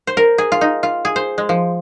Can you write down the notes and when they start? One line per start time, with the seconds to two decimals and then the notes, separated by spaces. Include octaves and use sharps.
0.07 C5
0.17 A#4
0.38 G#4
0.52 F4
0.61 D#4
0.83 F4
1.05 G#4
1.16 C5
1.38 G#3
1.49 F3